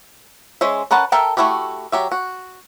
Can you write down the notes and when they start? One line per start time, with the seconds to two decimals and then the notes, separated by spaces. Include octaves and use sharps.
0.61 G#3 C#4 C5 E5
0.91 C#4 A#4 B4 F#5 A5
1.12 A4 A#4 E5 G5 A5
1.37 A3 A#3 E4 F#4 G4
1.92 F#3 G4 E5
2.11 F#4